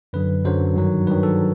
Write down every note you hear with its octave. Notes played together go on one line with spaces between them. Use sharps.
F#2 D3 F#3 B4
F#2 D3 F#3 C5
G2 D#3 F#3
G2 D#3 F#3 B4
A4